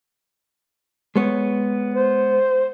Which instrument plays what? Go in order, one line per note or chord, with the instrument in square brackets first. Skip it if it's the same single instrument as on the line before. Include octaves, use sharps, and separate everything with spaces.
[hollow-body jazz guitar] G#3 B3 C#5
[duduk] C5